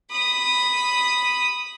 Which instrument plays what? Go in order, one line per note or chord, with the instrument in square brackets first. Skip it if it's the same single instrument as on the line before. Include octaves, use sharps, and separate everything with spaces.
[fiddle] B5 D#6